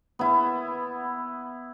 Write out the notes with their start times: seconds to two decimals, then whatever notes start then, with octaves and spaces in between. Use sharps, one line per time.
0.19 B3 E4